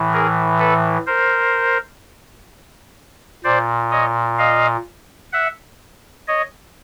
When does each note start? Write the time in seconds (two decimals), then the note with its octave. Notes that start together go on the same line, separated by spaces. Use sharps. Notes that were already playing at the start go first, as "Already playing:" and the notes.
Already playing: A2 E3
0.13 G#4 A#4
0.59 A4 B4
1.07 A#4 C5
3.44 A#2 C5 D5
3.91 C#5 D#5
4.38 D#5 F5
5.33 E5 F#5
6.28 C#5 D#5